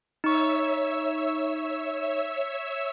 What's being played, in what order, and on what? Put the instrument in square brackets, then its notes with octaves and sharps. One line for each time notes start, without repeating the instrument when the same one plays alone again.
[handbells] D#4 C#6 [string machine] C#5 E5 E6